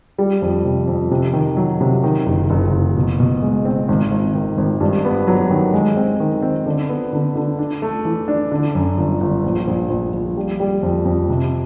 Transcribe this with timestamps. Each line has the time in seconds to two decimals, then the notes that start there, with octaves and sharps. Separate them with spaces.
0.18 G3
0.42 F2
0.64 C3
0.87 F2
1.11 C3
1.33 D#3
1.57 F#3
1.81 C3
2.04 D#3
2.26 F#1
2.50 F#1
2.72 F#1
2.97 B2
3.20 B2
3.42 G#3
3.65 C4
3.88 G#1
4.12 G#1
4.35 D#3
4.58 G#1
4.81 G2
5.05 B3
5.28 F#3
5.50 D#3
5.74 G#3
5.97 C4
6.20 D#3
6.43 C4
6.66 D3
6.89 B3
7.13 D3
7.36 D3
7.59 D4
7.82 A3
8.05 E3
8.28 D4
8.52 D3
8.75 F#2
8.98 G1
9.21 G1
9.44 A#1
9.67 A#1
9.90 A#1
10.14 A#1
10.37 G3
10.60 G3
10.83 F2
11.05 F2
11.29 C3